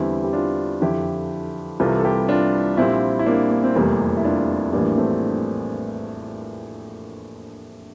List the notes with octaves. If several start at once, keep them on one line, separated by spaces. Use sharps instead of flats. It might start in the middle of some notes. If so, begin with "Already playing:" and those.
Already playing: E2 D3 G3 C4 E4
G4
D4 F4
F2 D3 F3 E4 G4
C2 C3 E3 G3 F4 A4
A4
E4 G4
D4 F4
A#1 A#2 G3 C4 E4
E4
A#3 D4
A#3
C4
F1 E2 C3 G3 A#3
E4
D4 F4
A#1 A2 E3 G3 A#3 D4
A3 C4